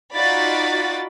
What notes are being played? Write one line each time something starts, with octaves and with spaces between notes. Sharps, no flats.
D#4 F4 F#4 D5 B5 A6